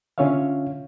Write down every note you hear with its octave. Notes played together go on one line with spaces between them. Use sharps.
D3 C#4 F4 C#5 E5 F5